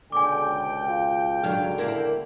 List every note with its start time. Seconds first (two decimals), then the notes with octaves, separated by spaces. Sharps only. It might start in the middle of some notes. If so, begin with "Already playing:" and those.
0.12 C#2 B2 D3 G5 G#5 D6
0.87 F4
1.43 G2 D3 F#3 F5
1.78 A#3 E4 A#4